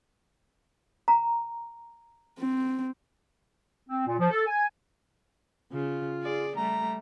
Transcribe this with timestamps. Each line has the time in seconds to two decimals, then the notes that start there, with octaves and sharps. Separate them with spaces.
1.08 A#5
2.39 C4
3.89 C4
4.06 A#2
4.18 F3
4.30 A4
4.47 G#5
5.73 C#3 F4
6.22 G#4 D5
6.56 G3 A3 A#5